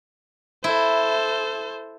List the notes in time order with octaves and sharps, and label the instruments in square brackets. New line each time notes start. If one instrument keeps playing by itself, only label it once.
[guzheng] E4 [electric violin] A4 C5